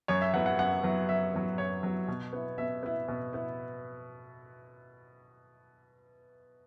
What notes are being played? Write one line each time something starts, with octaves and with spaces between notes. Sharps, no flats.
F#2 C#5
E5
F#3 B3 E4 F#5
F#5
F#2 F#5
F#3 B3 E4
F#2 E5
F#3 B3 E4
F#2 C#5
F#3 B3 E4
B2
B3 E4
B2 E5
B3 E4
B2
B3 E4